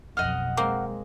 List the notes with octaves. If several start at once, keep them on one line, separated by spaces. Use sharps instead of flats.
B1 F2 D#5 F#5 F6
G#3 A#3 C4